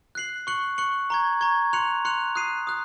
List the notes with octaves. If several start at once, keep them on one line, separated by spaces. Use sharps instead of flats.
F#6 C7 F#7
C#6 F#6 C#7 F#7
C#6 F#6 C#7 F#7
A#5 C#6 G#6
A#5 C#6 G#6
C6 F#6 C#7 F7
C6 F#6 C#7 F7
D#6 F#6 C7 D#7
D#6 F#6